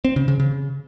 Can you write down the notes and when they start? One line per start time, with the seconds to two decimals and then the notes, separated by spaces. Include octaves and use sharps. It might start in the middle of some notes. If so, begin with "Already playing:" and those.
0.05 C4
0.16 C#3
0.28 C#3
0.40 C#3